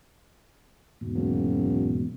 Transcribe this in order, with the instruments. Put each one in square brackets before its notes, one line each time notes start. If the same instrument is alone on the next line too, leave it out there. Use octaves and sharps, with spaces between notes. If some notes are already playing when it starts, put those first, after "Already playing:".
[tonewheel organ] E2 G#2 B2
[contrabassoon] F#1